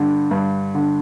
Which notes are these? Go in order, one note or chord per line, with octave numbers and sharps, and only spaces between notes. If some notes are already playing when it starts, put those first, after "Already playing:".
Already playing: G2 D3
G2
D3